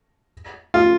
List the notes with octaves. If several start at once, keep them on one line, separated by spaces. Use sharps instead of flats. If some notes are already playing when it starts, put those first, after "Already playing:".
F4